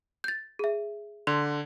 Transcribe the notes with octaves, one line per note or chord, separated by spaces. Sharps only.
G6 A6
G#4 E5
D3 C6